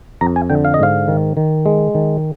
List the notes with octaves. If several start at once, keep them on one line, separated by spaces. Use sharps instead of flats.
F2 A#5
G#5
D3 G5
F5
D#5
G#2 F5
D#3
D#3
G#3
D#3